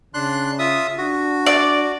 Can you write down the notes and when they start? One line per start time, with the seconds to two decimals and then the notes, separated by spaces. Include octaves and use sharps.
0.14 C#3 D4 C6 F#6
0.59 F4 E5 D#6
0.98 D4 F#4
1.46 D5